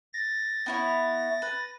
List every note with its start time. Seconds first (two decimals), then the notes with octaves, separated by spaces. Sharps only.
0.13 A6 A#6
0.66 B3 E4 C#5
1.42 B4